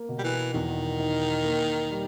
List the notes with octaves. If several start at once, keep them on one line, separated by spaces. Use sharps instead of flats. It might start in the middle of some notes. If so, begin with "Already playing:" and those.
Already playing: A#3
B2
G3
E3
E2 D#3
D#4
A#3
G3